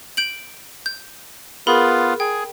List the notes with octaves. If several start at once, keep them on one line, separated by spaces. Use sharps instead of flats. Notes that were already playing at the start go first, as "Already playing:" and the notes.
G6 D7 F#7
G6
B3 F4 G#4 A#4 B5
G#4 G5